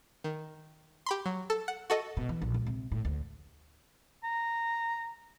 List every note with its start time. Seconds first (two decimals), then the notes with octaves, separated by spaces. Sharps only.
0.24 D#3
1.06 G4 B5 C6
1.26 F#3
1.50 A4
1.68 F#5
1.90 F#4 A4 D#5
2.17 B2
2.29 E3
2.42 A#1
2.54 C#2
2.67 C3
2.92 A2
3.05 D2
4.24 A#5